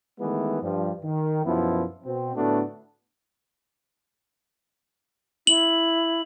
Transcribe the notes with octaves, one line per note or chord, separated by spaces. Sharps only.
D#3 E3 G#3 A3 B3 E4
G2 F3
D#3
F#2 B2 F3 B3 E4
B2 C4
A2 D3 A3 B3 D4 F#4
E4 F#7